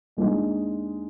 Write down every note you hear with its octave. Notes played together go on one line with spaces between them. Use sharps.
D#2 G#3 D4 D#4